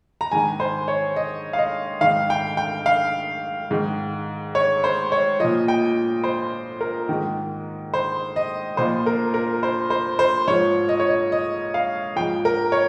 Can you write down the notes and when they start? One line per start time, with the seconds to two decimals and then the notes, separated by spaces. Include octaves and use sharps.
0.21 A#5
0.31 G#2 D#3 G#5
0.60 C5
0.88 C#5
1.16 D#5
1.53 F5
1.59 D#5
2.01 G#2 D#3 F5
2.30 G5
2.57 G5
2.86 F5
3.71 G#2 D#3
4.55 C#5
4.84 C5
5.12 C#5
5.40 F3 D#5
5.44 A#2
5.68 G5
6.24 C5
6.81 A#4
7.09 G#2 D#3
7.94 C5
8.36 D#5
8.77 A#2 F3 C5
9.06 A#4
9.34 A#4
9.63 C5
9.90 C5
10.19 C5
10.47 G#2 F3 C#5
10.89 D#5
11.00 C#5
11.09 D#5
11.32 D#5
11.74 F5
12.16 F3 G5
12.20 G#2
12.45 A#4
12.72 C#5